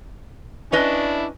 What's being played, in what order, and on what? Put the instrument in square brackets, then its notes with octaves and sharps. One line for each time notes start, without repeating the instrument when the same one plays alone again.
[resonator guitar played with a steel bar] C#4 B4 D#5 [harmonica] D4 E4